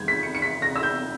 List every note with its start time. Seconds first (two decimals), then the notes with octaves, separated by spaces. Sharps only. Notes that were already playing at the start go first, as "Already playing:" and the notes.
Already playing: E2 D#3 G3 G6 G#6
0.08 B6
0.23 C#7
0.35 C#7
0.42 B6
0.62 A#6
0.76 E6
0.83 G6